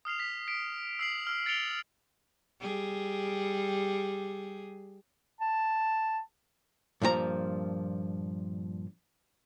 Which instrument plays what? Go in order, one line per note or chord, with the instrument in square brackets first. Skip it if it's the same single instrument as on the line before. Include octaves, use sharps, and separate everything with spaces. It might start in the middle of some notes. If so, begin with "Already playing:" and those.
[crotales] D#6 F6 C7 F7
B6
B6 D7
E6 C7 F#7
E6 F6
A6 C#7 D7 F7 G7
[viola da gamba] G3 G#4
[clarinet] A5
[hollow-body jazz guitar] G2 A#2 F3 F#4 A#5